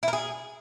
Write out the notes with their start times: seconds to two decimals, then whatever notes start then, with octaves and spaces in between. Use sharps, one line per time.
0.03 E4
0.08 A#4
0.13 G#4